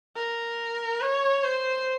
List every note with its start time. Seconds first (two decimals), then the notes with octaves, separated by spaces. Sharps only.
0.15 A#4
1.01 C#5
1.43 C5